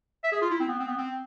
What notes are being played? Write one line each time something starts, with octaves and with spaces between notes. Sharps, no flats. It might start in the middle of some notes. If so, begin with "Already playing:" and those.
E5
G#4
F4
E4
C4
B3
C4
B3
C4